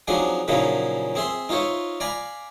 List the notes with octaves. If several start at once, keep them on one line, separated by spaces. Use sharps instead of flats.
F3 F#3 C4 D4 D#4 G#4
A#2 C#3 F3 F#3 D#4 E4
C4 G#4 E5 C6
D#4 F4 C5 C#5 E5
D5 F5 G#5 A#5 B5